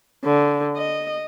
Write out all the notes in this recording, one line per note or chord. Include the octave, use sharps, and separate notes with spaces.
D3
D#5